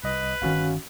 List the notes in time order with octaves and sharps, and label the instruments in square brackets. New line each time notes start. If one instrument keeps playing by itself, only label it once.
[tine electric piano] C2 D#5 [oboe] B4
[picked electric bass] G1 D#3 [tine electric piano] C#4 F#4 F5